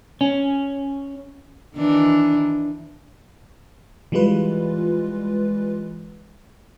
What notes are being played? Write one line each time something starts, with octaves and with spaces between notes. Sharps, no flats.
C#4
D#3 E3 D4
E3 G3 G#3 F4 B4